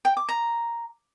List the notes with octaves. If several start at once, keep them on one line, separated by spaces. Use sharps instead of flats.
G5
D6
A#5